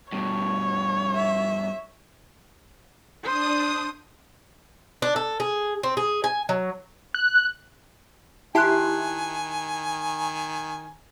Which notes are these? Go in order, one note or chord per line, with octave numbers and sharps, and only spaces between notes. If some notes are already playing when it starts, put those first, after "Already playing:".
G2 B2 C#5
E5
D4 C5 D#6
D4
A4
G#4
C4
G#4
G#5
F#3
F#6
D#3 E4 G4 G#5 A5 C6 F#6